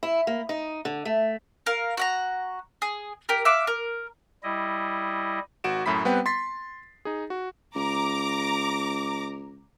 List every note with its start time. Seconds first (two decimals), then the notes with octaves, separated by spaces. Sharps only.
0.03 E4
0.27 A#3
0.49 D#4
0.85 D3
1.05 A3
1.66 A#4 F5
1.97 F#4 F#5 A#5
2.82 G#4
3.29 G4 A#4
3.45 E5 F5 D6 F#6
3.67 A#4
4.43 G3 E4 D#5
5.64 G#1 F#4 D7 E7
5.86 F#2 A2 E4 B5 B6
6.05 G3 B3 C4 B4 F#5 G5
6.26 C6 A6 B6 C7
7.05 D#4 G#4
7.30 F#4
7.75 C#2 A#5 D6